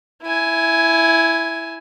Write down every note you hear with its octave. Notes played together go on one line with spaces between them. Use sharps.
E4 G#5